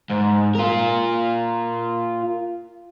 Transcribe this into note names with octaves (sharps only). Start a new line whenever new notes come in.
G#2
F4 A#4